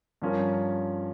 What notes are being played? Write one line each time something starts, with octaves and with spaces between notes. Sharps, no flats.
G2 F3 C#4 F4 A#4